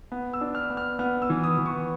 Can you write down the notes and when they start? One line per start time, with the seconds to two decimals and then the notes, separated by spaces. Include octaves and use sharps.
0.12 B3
0.33 E6
0.41 D4
0.55 F6
0.70 B3
0.77 F6
0.99 B3 F6
1.22 E6
1.30 E3
1.44 D#6
1.58 E3
1.66 C#6